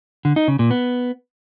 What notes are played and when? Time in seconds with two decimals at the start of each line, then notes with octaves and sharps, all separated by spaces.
0.25 D3
0.36 D#4
0.48 C#3
0.59 A#2
0.71 B3